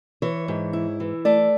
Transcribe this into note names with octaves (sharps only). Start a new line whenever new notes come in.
E3 C#5
G#2
E4
E3
A3 D5